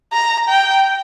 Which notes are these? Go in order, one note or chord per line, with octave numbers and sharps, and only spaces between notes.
A#5
G5